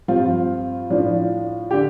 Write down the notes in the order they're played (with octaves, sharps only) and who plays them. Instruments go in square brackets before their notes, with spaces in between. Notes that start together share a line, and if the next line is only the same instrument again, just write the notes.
[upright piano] G2 F3 C4 F4
A2 F3 D4
D3 G4